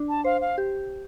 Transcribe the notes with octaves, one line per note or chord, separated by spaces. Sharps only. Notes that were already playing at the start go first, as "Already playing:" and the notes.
Already playing: D4
A5
C5 F5
F5
G4